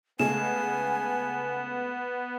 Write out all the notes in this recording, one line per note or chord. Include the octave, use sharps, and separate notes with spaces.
C#3 G#3 A3 B3 G#5 E7